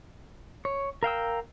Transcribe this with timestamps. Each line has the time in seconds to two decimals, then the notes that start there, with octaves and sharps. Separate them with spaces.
0.65 C#5
1.03 A#4 F5 G5 E6